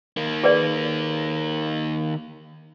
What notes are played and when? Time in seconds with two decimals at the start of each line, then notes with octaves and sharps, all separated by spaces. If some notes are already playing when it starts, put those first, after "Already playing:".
0.17 D#3 A#3
0.44 G#4 B4 D5